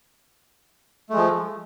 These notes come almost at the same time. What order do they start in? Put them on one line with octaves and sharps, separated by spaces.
A3 G#3 F3